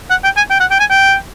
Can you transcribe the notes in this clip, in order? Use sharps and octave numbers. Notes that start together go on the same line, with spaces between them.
F#5
G5
G#5
G5
F#5
G5
G#5
G5